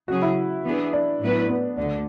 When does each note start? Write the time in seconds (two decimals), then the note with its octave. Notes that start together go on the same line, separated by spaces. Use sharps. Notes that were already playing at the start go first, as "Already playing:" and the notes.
0.08 C#3 F#3 C#4 F#4 G#4
0.22 E4
0.64 E3 B3 D4 G#4
0.93 D4
1.21 A2 F#3 B3 E4 B4
1.49 B3
1.77 D2 D3 D4